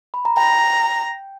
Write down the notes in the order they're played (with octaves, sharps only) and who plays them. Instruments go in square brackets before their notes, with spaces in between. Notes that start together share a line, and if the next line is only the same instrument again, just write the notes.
[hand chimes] B5
A#5
[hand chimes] G5 [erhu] A#5